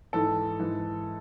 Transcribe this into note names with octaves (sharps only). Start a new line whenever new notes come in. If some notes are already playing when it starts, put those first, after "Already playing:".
G#2 E3 A4
G#2 E3